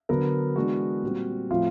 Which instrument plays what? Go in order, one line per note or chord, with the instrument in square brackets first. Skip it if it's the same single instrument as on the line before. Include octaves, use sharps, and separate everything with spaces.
[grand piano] D3 F#3 B3 A#4
E3 G#3 B3 D4 F#4
A#2 G3 C4
A2 F3 A3 C4 F4